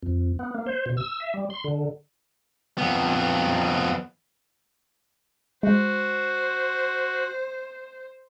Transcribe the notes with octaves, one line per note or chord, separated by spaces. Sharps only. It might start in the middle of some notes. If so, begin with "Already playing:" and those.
F2
B3
A#3
C5
B2
E6
E5
G3
C6
D3
F2 B3
G#3 F#4 C5